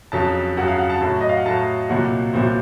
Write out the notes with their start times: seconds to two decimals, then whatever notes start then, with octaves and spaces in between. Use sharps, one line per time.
0.12 F2 C#3 F#3 A5
0.57 F2 C#3 F#3 F#5
0.68 F5
0.79 F#5
0.89 A5
1.01 A2 F#3 A5
1.21 D#5
1.29 F5
1.36 F#5
1.45 A2 F#3 A5
1.89 C2 A#2 F#3 F#5
2.33 C2 A#2 F#3 C5